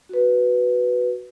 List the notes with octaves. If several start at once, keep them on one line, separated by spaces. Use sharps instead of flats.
F#4 B4